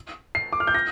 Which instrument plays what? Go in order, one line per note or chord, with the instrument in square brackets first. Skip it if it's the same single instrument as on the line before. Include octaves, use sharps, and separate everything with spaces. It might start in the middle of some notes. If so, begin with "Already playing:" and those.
[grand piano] C7
D6
F6
G6
A#6